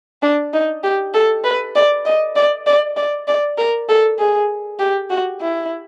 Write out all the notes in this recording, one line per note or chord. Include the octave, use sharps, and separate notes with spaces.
D4
D#4
G4
A4
B4
D5
D#5
D5
D5
D5
D5
A#4
A4
G#4
G4
F#4
E4